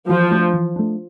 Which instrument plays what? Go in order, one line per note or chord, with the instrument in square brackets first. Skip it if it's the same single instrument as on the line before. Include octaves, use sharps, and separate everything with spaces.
[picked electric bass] E3 [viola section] F3
[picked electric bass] A3 D4
E3
A3 D4